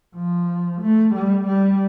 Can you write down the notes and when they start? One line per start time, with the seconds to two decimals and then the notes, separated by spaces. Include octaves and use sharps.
0.16 F3
0.82 A3
1.14 G3
1.47 G3